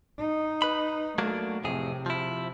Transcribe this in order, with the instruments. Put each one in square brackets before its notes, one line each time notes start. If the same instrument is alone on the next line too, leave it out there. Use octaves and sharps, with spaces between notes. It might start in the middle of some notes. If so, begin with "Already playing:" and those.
[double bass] D#4
[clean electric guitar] B4 B5
[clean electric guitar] F#3 A#3 D4 [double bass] A3
[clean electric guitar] F2 A2 G#4 [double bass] C3
[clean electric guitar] F3 E4